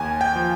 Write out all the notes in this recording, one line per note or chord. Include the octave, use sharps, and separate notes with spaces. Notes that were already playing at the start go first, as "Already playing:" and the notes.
Already playing: D#2 G#5
G5
F3